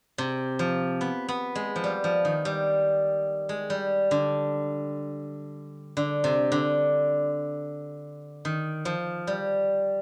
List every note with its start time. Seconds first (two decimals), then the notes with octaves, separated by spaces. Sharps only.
0.18 C3
0.59 F3
1.01 B3
1.28 B3
1.55 G#3
1.76 F3
1.84 G3
2.04 F3
2.25 D#3
2.45 G3
3.49 G#3
3.70 G3
4.11 D3
5.97 D3
6.24 C3
6.52 D3
8.45 D#3
8.85 F3
9.27 G3